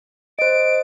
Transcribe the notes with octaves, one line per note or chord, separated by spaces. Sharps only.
C5 D#5 D7